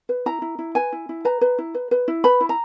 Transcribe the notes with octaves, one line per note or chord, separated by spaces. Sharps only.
B4
E4 A#5
E4
E4
B4 G#5
E4
E4
B4 A#5
B4
E4
B4
B4
E4
B4 B5
E4
A#5